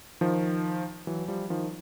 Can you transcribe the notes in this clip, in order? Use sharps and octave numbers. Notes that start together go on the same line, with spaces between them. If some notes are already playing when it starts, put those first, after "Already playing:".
D#3 F3
E3 F#3
F3 G3
D#3 F3